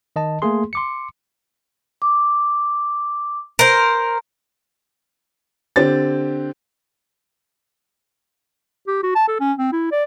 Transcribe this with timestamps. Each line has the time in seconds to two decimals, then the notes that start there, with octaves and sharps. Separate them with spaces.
0.16 D#3 D#5 A5
0.42 A3 A#3 G#4 C6
0.73 C6 D6 C#7
2.02 D6
3.59 A#4 C5
5.76 D3 C4 G4 A6
8.87 G4
9.03 F#4
9.15 A5
9.28 A4
9.40 C#4
9.58 C4
9.72 E4
9.92 D5